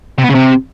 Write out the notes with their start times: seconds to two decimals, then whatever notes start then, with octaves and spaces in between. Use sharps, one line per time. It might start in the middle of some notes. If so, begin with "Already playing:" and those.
0.18 C3
0.24 B3
0.29 C#3
0.35 C3